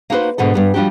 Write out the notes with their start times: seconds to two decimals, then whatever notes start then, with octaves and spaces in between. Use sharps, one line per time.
0.10 A#3 D#4 F#4 G4 B4 C5
0.38 G#2 B2 D3 A4
0.54 G2 G3 B3
0.74 F3 G3 D4 F#4 G4